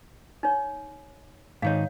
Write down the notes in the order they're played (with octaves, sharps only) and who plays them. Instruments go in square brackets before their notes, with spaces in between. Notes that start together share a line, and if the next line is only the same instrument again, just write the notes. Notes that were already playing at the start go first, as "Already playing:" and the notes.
[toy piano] D#4 C#5
[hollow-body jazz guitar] G#2 D#3 D#4 [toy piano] C#5 F5